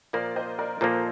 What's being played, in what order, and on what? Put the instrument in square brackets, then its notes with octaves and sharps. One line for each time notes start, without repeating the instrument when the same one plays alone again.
[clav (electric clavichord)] A#2 F3 A#3 [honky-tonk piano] A#4 D5
[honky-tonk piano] C5 D#5
A#4 D5
[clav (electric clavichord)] A#2 F3 A#3 [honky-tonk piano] A4 C5